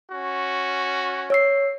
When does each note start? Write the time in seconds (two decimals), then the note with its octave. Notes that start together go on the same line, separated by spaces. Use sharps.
0.12 C#4 F#4
1.30 C#5 E6 C7